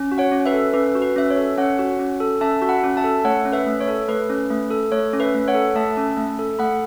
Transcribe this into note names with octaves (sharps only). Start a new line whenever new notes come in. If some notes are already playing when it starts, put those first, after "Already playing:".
Already playing: C#4
F#4
C#5 F#5
C#4
B4 E5
A4
C#4 B4
F#4
B4
C#4 E5
C#5
A4
C#4 C#5 F#5
F#4
C#4
A4
C#4 E5 A5
F#4
F#5 B5
C#4
E5 A5
A4
A3 C#5 F#5
C#4
B4 E5
A3
C#5
A4
A3 B4
C#4
A3
A4
A3 C#5
C#4
B4 E5
A3
C#5 F#5
A4
A3 E5 A5
C#4
A3
A4
A3 F#5 B5